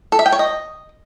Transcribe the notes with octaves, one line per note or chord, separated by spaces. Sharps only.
A4
E5
G5
C#5
D#5